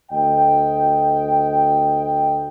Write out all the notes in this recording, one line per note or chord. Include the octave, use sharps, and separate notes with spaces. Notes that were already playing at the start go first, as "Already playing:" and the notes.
D2 D#5 G5